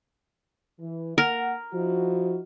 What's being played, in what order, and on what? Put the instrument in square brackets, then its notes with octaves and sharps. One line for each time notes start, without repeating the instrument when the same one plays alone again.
[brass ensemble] E3
[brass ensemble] A#3 F#5 [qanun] A#4
[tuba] F3 [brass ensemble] D#4 E4 F#4